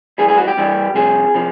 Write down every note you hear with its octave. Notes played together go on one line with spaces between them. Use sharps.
G2 E3 G3 G#4
G#4
F#4
G4
G2 E3 G3
C2 C3 F3 G#4
C3 F3